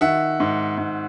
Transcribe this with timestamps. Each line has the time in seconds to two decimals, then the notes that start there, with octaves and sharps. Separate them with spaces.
0.01 D#3 E5 F#5
0.40 G#2
0.78 G#2